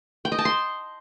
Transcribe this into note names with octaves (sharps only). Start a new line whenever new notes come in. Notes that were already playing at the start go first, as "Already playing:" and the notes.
G5
D#5
A5
C6